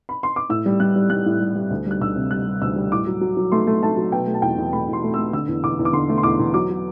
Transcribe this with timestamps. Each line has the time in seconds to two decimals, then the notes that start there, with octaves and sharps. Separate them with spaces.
0.09 B5
0.23 C6
0.36 D6
0.49 A2 E6
0.66 G3
0.80 G3 F#6
0.96 G3
1.10 G3 F#6
1.26 A2
1.40 G3
1.56 G3
1.70 D2
1.86 G3 F#6
2.01 D2 E6
2.16 C3
2.31 G3 F#6
2.47 G3
2.61 D2 E6
2.76 G3
2.92 A2 D6
3.07 F#3
3.21 F#3
3.37 F#3
3.52 A3 C6
3.67 A3
3.83 A3 A5
3.97 F#3
4.12 B2 G5
4.27 A3
4.34 A5
4.42 E2 G5
4.58 E2
4.73 A3 B5
4.88 E2 C6
5.04 A3
5.14 A3 E6
5.33 D3 E6
5.48 E2
5.63 E2 D6
5.79 E2
5.85 D6
5.93 D3 C6
6.09 A3
6.18 C6
6.23 E2 D6
6.39 E2
6.54 F#3 D6
6.70 F#3